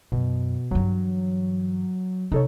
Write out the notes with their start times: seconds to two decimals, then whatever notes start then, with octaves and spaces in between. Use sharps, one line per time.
0.12 F#2 B2
0.71 G2 E3 F#3
2.32 C3 D#4 A4 C#5